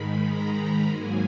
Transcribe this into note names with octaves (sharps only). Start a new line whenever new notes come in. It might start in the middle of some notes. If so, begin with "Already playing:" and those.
Already playing: G#2 D#3 G#3 B5
A#5
G#2 F#3 A#3 G#5